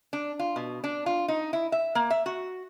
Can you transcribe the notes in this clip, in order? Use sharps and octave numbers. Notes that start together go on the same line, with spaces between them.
D4
F4
B2
D4
F4
D#4
E4
E5
A#3
E5
F#4